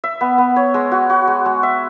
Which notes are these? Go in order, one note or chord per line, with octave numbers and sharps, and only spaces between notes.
E5
B3
B3
C#5
G#3
F#4
F#4
G#3
G#3
E5